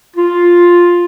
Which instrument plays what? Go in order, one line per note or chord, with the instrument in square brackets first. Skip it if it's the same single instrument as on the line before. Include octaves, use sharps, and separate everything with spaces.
[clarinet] F4